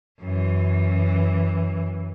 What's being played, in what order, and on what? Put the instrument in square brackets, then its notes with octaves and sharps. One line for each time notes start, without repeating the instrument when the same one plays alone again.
[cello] F#2 E3